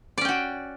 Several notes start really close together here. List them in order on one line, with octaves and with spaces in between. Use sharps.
D5 C#4 G5 F#4